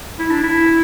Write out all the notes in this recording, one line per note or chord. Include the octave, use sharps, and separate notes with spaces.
E4
D4
E4